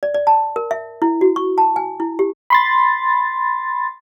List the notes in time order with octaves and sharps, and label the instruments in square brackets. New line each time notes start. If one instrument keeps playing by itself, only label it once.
[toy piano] D5
D5
A5
A#4
E5
E4
F#4
C#6
A5
G#5
E4
G4
[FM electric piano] B5 C6 A6